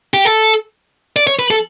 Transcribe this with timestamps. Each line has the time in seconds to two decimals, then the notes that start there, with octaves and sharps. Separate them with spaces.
0.14 G4
0.25 A4
1.16 D5
1.27 C#5
1.39 B4
1.51 A4